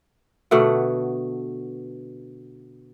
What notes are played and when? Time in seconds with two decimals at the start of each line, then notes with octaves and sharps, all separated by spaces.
0.51 B2 D3 A3 F#5